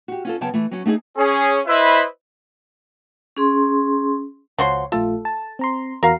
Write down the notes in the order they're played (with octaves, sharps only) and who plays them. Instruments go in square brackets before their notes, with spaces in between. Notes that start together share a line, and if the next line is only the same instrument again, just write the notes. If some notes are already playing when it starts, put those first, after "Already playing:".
[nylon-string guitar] F#4 G4
C#4 F4 A4
F#2 C#3 B3 C#5 G5 A5
E3 A3
F#3 C#4 F#4
A3 D#4 F4 G#4
[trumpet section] C#4 G#4
E4 B4 C5 D#5 E5
[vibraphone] C#4 G#4 C6
[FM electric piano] C#2 C#5 [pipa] F3 F#4 C6
[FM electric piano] A#1 A3 F4 [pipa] A4
[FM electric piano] A5
C4 A#5 C6
[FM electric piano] E2 F#4 A#5 [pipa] A#4 F5